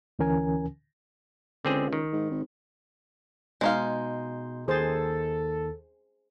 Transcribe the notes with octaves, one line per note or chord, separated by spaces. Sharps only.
D2 E3 C#4 A#4 G#5
C#2 D3 C4 G#4
D#3
G#2
G#1
B2 G#3 D#4 F5 C6 G6
D#2 D#3 G#4 A4 C5 A6